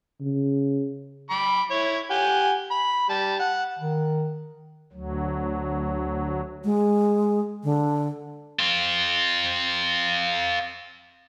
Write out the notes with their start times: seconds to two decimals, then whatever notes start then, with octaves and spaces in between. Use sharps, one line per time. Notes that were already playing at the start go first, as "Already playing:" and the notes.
0.21 C#3
1.30 B5 D6
1.71 E4 C#5
2.10 G4 F#5 G#5
2.71 B5
3.09 G3 A5
3.40 F#5
3.79 D#3
4.92 D2 F#3
6.64 G#3
7.64 D3
8.59 C4 F4